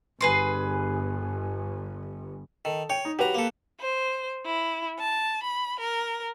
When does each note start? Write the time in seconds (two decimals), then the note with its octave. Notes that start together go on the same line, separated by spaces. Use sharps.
0.21 G1 G#4 B4 C6
2.65 D#3 A4
2.90 C#5 G5
3.05 D#4
3.19 F#3 G4 B4 A#5
3.34 A#3 A4
3.81 C5
4.45 E4
4.99 A5
5.44 B5
5.79 A#4